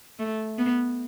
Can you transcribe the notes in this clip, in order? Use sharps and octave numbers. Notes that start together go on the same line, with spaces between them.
A3
B3